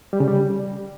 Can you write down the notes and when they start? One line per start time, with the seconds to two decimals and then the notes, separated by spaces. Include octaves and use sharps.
0.13 G3
0.20 C#3
0.28 G3